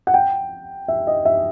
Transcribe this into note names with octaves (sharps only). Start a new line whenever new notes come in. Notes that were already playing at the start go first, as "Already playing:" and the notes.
F#5
G5
E5
D#5
E5